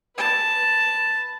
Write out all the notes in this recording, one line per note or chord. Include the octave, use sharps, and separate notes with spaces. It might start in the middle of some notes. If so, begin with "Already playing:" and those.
B4 A5